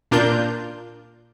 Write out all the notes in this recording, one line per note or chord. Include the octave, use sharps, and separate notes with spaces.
A#2 D4 F4 A#4 G6